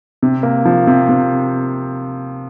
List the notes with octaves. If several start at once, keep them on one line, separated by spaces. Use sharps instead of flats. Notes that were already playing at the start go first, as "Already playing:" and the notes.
C3
A#3
F3
C3
C3